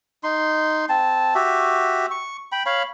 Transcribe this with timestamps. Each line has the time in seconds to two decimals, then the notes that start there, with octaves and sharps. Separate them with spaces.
0.23 D#4 C6
0.89 C4 A5
1.35 F#4 G4 E5
2.11 C#6
2.52 G5 B5
2.66 C#5 F5 B5